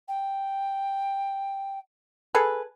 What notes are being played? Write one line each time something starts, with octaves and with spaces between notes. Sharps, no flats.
G5
G#4 A4 B4